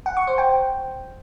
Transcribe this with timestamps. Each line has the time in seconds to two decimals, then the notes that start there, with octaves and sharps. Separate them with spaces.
0.06 F#5
0.17 C#6
0.27 C5
0.38 G5